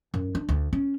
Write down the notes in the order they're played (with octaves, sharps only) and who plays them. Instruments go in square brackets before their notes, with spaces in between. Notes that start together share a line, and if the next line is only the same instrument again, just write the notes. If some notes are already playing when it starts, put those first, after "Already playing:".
[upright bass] F#2
D4
D2
C#4